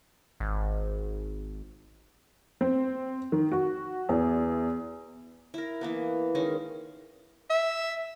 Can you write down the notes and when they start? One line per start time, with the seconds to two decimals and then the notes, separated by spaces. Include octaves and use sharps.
0.40 G#1
2.61 C4
3.32 D#3
3.52 F#4
4.09 E2
5.54 E4 A#4
5.81 E3 A#3 B3
6.35 D#3 G#3 C#4
7.50 E5